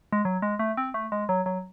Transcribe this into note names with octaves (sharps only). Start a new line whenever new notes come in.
G#3
F#3
G#3
A3
C4
A3
G#3
F#3
F#3